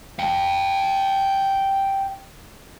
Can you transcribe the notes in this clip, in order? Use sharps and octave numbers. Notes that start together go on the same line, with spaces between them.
F5 G5